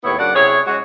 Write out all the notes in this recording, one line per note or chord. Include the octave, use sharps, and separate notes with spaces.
D#2 A2 B3 E4 C#5
F#2 C#3 D4 D5 F#5
C3 E4 G#4 C#5
G#3 C#4 F#4